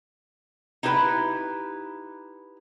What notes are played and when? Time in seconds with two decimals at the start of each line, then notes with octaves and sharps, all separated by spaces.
0.83 D#4 E4 G4 B4